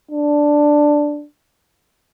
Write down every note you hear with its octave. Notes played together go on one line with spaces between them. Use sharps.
D4